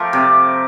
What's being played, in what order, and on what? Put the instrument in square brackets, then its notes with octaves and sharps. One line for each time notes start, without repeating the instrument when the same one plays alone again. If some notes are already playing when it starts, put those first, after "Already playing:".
Already playing: [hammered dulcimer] F3 A3 F4 G4 A#4 C5
C3 D5